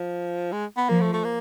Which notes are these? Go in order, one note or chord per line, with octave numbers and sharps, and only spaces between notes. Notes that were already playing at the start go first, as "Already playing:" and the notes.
Already playing: F3
G#3
B3
F3 A#3
A3
A3
A#3